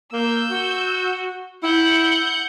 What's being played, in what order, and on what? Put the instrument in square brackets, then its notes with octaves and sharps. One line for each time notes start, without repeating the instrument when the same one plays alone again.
[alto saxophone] A#3 [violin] E6 G6
[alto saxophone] F#4
[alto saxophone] E4 [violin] F#5 G6